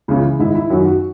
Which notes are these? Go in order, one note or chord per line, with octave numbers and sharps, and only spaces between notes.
C#2 C#3 E3 E4
G#2 D#3 E4
E4
F#2 D#3 F#4
F#4